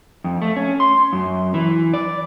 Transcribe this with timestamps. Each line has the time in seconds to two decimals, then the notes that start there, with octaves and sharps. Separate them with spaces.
0.24 F2
0.42 A3
0.56 C#4
0.80 C6
1.13 F#2
1.54 E3
1.93 D5